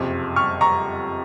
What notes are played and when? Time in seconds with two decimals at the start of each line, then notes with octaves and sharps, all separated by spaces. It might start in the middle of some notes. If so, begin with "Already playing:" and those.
Already playing: F#1 F2 C3
0.36 C#6 F6
0.61 A#5 C#6